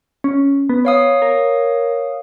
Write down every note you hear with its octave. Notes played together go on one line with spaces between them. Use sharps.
C#4
B3
C#5 F5 D#6
A#4